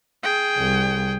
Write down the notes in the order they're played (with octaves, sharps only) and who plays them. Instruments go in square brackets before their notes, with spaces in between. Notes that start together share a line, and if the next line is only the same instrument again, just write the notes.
[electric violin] G#4 G5
[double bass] C2